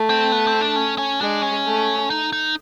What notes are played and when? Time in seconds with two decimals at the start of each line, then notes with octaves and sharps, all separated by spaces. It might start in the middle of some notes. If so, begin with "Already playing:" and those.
Already playing: A3
0.10 C4
0.32 B3
0.47 C4
0.61 D4
0.76 C#4
0.98 C#4
1.21 G#3 D4
1.43 C#4
1.66 A3
2.10 D#4
2.33 D#4